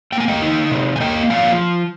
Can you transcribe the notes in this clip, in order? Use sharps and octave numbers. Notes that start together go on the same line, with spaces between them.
A#3 G5
G#5
D#5 G5
D#4
C3
G#5
A#3 D#5 G5
F3 F5 G#5